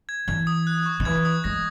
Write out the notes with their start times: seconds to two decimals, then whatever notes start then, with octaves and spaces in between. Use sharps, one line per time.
0.09 G#6
0.28 E3 G#6
0.47 D#6
0.67 F#6
0.86 C#6
1.00 D#3
1.05 E3 G#6
1.25 D#6
1.44 G#3 A#6